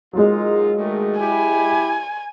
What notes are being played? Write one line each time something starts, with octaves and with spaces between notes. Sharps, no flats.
F#3 G#3 A#3 D#4 F4
A#2 D#3 A3
E4 G4 G#5